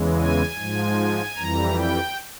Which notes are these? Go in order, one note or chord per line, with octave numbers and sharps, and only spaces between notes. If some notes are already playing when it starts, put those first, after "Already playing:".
Already playing: E2 C#3 E3 G#3
G#5
G#2 F3 G#3
F2 E3 G3 A#5
G5